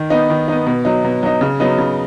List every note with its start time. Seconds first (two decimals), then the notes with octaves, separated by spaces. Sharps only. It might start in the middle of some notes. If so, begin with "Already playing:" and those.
Already playing: D#3
0.10 B3 D#4
0.30 D#3
0.48 B3 D#4
0.66 B2
0.85 F#3 D#4
1.04 B2
1.23 F#3 D#4
1.41 C#3
1.60 F#3 B3 D#4
1.78 C#3